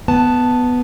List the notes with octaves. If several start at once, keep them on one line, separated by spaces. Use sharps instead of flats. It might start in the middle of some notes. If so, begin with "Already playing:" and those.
B3 A5